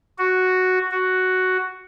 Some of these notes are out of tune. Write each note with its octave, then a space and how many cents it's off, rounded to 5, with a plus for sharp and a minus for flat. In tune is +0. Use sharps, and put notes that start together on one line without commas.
F#4 +0
F#4 +5